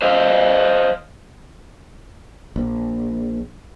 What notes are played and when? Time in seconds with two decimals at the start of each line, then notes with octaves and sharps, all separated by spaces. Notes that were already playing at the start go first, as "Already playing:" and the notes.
0.02 C5 D#5 F5
2.56 A#1